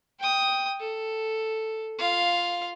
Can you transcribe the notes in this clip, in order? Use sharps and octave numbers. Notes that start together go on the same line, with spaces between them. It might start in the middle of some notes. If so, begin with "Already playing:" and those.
G5 D#6
A4
F4 F5